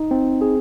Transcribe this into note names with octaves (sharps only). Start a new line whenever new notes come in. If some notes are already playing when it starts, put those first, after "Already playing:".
Already playing: D#4
C4
G#4